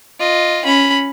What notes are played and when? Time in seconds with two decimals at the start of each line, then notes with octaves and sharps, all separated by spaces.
0.20 F4 D#5
0.65 C#4 B5